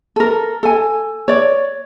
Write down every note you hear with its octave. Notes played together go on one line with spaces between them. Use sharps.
A4 A#4
A4 G#5
C#5 D5